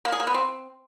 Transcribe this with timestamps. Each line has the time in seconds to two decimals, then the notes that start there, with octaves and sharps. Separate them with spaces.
0.05 A#3
0.12 G#4
0.20 A#3
0.27 B3
0.34 C4